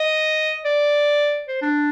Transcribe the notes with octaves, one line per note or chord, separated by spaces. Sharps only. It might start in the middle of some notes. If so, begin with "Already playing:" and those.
Already playing: D#5
D5
C5
D4